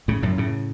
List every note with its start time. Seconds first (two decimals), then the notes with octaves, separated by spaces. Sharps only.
0.08 A2 C#3
0.23 F#2 A2
0.38 A2 C#3